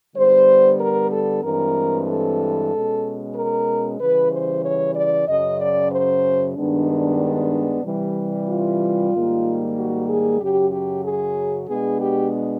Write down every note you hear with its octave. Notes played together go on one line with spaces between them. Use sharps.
D3 G3 B3 C5
A#4
A4
G2 E3 G#3 C4 A#4
A4
B2 G#3 C#4
A#4
C#3 E3 G3 B4
C5
C#5
D5
F#2 C#3 F#3 D#5
D5
C5
G2 D#3 G#3 B3 D4
C3 E3 G3
F4
G#2 D#3 G3 A#3
F#4
G#4
F#2 C#3 F#3 G4
G4
G#4
B2 G#3 B3 D4 G#4
G4